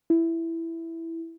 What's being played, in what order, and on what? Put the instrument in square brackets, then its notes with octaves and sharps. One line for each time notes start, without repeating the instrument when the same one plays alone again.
[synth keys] E4